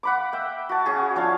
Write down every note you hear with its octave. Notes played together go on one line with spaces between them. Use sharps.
F#5 B5 D6
E5 G5
F#4 A5
C#4 F#4 G#4
F3 D4 C#5 F5